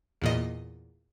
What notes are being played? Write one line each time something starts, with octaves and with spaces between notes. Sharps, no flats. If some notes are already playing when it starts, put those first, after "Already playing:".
E2 A#2 D#5